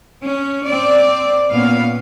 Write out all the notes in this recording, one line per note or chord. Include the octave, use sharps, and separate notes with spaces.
C#4
C4 D5
A#2 B3 C#4 F5